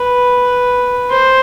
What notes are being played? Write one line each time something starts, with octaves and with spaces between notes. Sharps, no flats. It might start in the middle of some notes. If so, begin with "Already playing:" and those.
Already playing: B4
C5